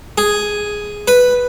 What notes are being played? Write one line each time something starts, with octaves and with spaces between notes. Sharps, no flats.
G#4
B4